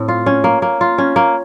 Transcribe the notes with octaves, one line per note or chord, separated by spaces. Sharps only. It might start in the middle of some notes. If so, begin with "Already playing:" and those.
Already playing: A2 C4
F4
C#4
A#3
A#3
F4
C#4
A#3